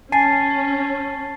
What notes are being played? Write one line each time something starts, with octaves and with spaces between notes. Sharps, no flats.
C#4 G#5 A5 A6 C7